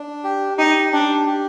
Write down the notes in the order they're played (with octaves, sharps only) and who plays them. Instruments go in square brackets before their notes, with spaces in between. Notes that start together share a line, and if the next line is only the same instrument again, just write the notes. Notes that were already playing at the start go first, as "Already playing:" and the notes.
Already playing: [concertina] D4
G4
[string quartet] D#4 [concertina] G4
[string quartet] D4 [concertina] G4
[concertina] G4